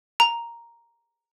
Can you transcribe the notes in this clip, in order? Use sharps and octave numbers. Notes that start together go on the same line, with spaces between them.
A#5